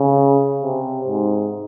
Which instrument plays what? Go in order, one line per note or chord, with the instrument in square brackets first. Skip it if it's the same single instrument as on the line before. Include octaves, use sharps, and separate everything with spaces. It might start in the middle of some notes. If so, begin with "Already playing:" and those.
Already playing: [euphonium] C#3
C3
G#2